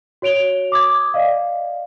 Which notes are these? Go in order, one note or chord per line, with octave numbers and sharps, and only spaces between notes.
F#4 C#5 D7 F7 G7
D6 D#6 G#6
D5 D#5 F5